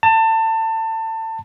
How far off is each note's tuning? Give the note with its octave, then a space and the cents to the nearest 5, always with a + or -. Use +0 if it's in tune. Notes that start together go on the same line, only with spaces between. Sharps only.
A5 +25